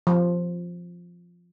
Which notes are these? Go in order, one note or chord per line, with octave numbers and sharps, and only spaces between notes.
F3